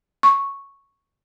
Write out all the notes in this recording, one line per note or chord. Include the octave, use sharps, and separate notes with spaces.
C#6